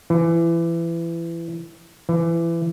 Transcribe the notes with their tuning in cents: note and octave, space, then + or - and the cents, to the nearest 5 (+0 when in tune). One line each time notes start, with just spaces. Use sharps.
E3 +25
E3 +25